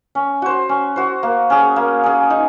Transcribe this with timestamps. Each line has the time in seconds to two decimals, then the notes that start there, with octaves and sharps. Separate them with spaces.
0.15 C#4
0.42 F#4 C5
0.69 C#4
0.96 F#4 C5
1.23 A#3
1.50 C#4 G#4
1.76 A#3
2.03 C#4 G#4
2.30 D#4